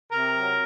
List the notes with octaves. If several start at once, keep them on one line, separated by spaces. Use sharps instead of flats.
C3 A#4
F#3